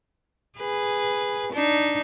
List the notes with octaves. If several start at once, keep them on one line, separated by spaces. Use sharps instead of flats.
G#4 B4
D4 D#4